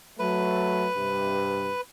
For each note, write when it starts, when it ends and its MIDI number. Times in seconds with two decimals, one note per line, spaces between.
0.19 0.87 54
0.19 0.87 57
0.19 1.81 71
0.97 1.70 43
0.97 1.70 48